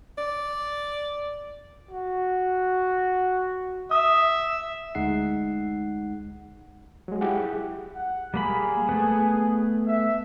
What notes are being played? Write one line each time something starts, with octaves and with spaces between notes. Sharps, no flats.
D5
F#4
E5 D#6
D2 G#3 D#4 F#5 C7
F#3 G#3
E4 G4 G#4 F#5
F#5
G3 A#3 G#4 B5
A3 B3
E5